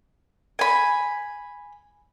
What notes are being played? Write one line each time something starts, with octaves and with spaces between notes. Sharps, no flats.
G#5 B5